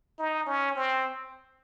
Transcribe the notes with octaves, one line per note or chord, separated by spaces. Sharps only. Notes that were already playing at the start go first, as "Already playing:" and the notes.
D#4
C#4
C4